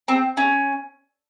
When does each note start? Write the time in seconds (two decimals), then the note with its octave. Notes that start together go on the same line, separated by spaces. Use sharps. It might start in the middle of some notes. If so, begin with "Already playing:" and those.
0.08 C4
0.37 C#4